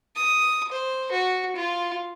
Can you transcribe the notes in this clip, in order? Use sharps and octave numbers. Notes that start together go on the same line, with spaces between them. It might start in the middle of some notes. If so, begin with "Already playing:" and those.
D#6
C5
F#4
F4